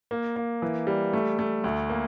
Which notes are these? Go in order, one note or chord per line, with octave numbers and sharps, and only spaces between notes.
A#3
A#3
E3
G3
A3
A3
D2
A#3